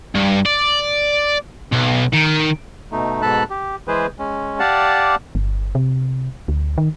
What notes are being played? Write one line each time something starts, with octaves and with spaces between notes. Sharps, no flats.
G2
D5
B1
D#3
B2 A3 D#4
G#2 B2 A4 A5 B5 F#6
G4
E3 G#3 G#4 B4 C5
G#3 C#4
G4 D5 F5 F#5 A5
G1
C3
D2
D#3